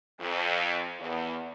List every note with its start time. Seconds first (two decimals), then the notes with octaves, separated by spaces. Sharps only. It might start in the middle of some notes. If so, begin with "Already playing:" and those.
0.20 F2
1.00 E2